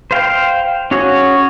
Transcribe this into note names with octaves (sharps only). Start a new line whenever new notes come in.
C5 F5 G5
C#4 F#4 G#4 C#5